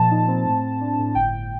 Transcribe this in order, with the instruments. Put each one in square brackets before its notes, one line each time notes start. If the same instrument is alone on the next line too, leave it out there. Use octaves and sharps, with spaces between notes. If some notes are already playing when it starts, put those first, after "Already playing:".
Already playing: [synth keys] A#2 F3 A5
D#4
C4
A2
A2
D4
A2
G1 G5
G1